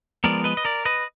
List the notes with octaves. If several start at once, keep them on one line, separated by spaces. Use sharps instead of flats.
F3 G#3 B3 A#4 D5
B4 D#5
D#5
A#4 D5
B4 D#5